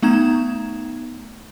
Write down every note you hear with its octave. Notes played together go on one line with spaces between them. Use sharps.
A3 B3 D#4 A#5 G#6 E7